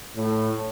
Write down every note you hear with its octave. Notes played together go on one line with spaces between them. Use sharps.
A2